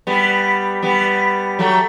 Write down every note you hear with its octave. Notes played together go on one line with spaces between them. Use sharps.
G3 B3
G3 B3
F#3 A3